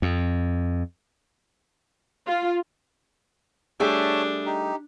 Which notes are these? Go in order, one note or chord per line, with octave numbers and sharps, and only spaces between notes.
F2
F4
G3 A3 D4 G#4 C#5 E5 A5
D#4 G4